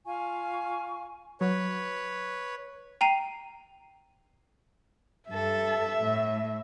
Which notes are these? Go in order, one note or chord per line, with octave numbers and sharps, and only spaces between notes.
F4 F5 G#5 C#6
F#3 B4 C#5
G5 A#5 C7 D#7
G2 A4 E5
A2